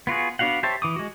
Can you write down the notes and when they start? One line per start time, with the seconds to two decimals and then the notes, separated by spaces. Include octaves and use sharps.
0.07 B3 F4 F#4 G#4
0.39 B3 D4 F#4 F5 F#5
0.63 G4 C5 C#5 E5 A5
0.82 E3 D6 D#6
0.96 G#3 F#4